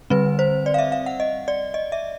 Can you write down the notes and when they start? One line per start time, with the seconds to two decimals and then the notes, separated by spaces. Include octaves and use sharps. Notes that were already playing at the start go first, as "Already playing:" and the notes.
0.10 D3 G3 C4 B4
0.39 C5
0.66 D5
0.74 F5
0.78 E5
0.92 F5
1.06 F#5
1.20 D#5
1.48 D5
1.74 D#5
1.92 E5